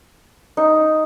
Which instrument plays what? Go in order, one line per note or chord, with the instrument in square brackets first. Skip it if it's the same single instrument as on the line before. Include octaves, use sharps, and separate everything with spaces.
[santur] D#4